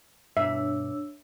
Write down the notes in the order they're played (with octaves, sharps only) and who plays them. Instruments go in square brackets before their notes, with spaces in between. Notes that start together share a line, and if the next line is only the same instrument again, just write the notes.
[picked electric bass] G2 B2 [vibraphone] D4 C#5 E6 [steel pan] E5